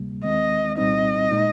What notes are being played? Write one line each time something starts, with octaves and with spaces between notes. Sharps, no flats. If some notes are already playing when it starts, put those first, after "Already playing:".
Already playing: D2 C3 G3 A#3
D#2 D#3 G#3 C4 D#5
C2 A#2 G3 C4 D#4 D#5
A#2 G#3 D#4